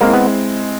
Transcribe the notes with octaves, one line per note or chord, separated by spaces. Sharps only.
G#3 A#3 C4 E4
B3